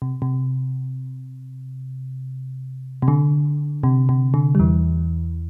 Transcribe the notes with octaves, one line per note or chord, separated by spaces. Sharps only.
C3
C3
C3
D3
C3
C3
D3
G3
E2 E3